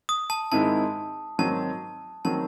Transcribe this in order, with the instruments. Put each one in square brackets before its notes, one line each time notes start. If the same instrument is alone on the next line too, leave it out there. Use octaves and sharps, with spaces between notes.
[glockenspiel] D#6
A5
[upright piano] G#2 D#3 G#3 C4 E4 [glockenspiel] A5
[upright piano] G#2 D#3 F#3 C4 [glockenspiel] A5
[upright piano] D#3 F#3 C4 [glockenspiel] A5